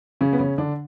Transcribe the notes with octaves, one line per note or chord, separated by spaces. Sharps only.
C#3 C#4
B3
C#3 C#4
D3 D4